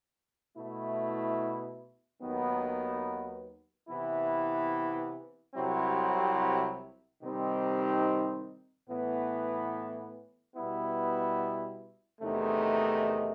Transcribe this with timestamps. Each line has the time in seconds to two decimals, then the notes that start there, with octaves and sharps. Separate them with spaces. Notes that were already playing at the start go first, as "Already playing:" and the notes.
0.56 B2 A3 E4
2.21 D#2 D#3 F#3 B3
3.89 C3 E3 B3 E4
5.54 C2 C3 F#3 C4 E4
7.22 C3 D#3 G3 C4 D#4
8.88 A2 E3 B3
10.53 B2 G3 B3 E4
12.20 E2 C3 D#3 A3 D#4